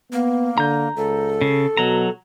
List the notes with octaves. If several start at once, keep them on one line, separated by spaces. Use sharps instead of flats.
A#3 B3
D3 A#5 G6
C#2 A4
C#3
B2 F#3 A#5